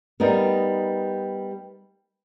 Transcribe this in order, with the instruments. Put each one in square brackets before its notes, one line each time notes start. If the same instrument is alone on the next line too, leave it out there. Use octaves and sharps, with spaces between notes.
[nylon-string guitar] G3 B3 D#4 A#4